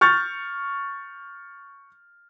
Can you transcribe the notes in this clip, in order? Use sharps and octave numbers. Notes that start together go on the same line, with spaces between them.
C#6 F6 G6 A6